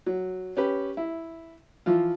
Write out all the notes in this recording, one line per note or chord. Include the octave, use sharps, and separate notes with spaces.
F#3
C#4 G4 B4
E4
E3 F3 F4